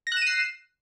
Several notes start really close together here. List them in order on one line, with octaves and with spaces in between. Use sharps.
A#6 F#6 E7 D#7 C7